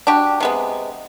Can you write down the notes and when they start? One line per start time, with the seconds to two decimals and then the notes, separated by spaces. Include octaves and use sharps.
0.07 D4 F#4 G4
0.40 C3 G#3 B3